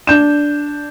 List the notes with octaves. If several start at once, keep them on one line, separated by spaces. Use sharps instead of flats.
D4 G6 E7